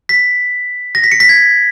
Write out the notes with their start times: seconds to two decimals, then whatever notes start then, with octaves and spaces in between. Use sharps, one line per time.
0.09 B6
0.95 A#6
1.04 B6
1.12 C#7
1.20 B6
1.29 G#6